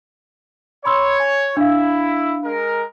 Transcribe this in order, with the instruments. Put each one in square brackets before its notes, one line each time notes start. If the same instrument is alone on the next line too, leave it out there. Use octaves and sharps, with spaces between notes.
[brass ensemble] C#5 [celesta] B5 C6 E6
[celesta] G#5
[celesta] D4 F5 [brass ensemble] E4
[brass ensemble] G#3 A#4